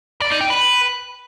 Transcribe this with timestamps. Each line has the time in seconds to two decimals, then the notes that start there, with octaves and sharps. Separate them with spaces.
0.21 D5
0.31 D#4
0.41 G5
0.50 B4